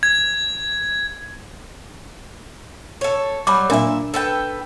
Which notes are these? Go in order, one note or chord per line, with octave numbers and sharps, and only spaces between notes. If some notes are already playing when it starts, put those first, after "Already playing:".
G#6
A4 C#5
F#3 G3 B5 D6
A#2 D4 A#4 E5
A4 B4 G5